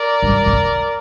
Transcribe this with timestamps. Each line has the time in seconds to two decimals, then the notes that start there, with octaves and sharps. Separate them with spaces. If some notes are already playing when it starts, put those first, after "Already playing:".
Already playing: A#4 D5
0.22 G2
0.46 F2